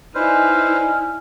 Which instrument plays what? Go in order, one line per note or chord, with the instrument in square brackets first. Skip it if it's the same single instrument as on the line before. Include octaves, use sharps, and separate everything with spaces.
[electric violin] D#4 E4 [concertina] B4 C5 [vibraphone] D5 D#5 G#5 [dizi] F6